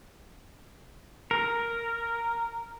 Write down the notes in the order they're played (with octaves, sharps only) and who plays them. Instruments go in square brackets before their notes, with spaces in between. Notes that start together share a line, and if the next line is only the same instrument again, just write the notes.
[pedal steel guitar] A#4